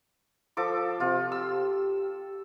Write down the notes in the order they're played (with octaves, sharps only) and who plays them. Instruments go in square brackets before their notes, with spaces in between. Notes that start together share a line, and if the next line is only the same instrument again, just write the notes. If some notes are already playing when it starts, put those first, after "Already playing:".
[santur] F3 A4 D6
[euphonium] C3 [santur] F4
[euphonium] G4 [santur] E6